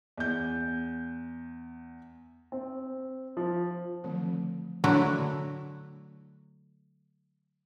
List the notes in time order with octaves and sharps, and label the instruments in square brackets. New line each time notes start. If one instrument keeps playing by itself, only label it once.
[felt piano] E2 G6
[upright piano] C4
F3
[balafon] D3 D#3 F3 F#3 A3 C4
[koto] D3 F#3 A3 E4 F#4